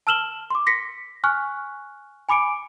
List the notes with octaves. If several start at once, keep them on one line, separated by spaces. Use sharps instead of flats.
A5 E6 F6 E7 F#7 G7
C6 D6
A#6 B6 C#7
G#5 C#6 F6 F#6
G#5 B5 D6 C#7 D7